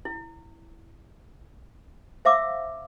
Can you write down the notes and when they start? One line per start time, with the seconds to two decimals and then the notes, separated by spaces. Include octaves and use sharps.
0.05 E4
2.25 C5 E5 F5 D6 E6